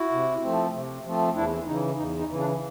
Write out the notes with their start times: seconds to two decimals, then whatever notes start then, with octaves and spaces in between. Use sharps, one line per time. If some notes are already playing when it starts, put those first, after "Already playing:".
Already playing: E4 F#4
0.11 C3
0.42 F3 A3 C4
0.74 C3
1.04 F3 A3 C4
1.35 E2 D4 E4
1.66 C#3 E3 D#4
1.97 E2 D#4
2.19 D#4
2.29 C#3 E3
2.40 D4